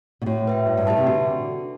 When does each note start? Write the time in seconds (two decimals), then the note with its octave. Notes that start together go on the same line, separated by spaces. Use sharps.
0.22 B2
0.26 A2 F#4
0.48 B4 E5 G5
0.66 G2 E4
0.77 G2
0.87 A2 G4 B4 E5 A5
0.97 C3
1.07 D3 F#4